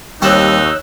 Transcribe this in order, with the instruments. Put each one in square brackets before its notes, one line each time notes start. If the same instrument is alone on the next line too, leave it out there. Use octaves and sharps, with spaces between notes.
[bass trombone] D#2 [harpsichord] G3 C4 [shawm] D#4 [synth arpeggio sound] C#5 E6 F#6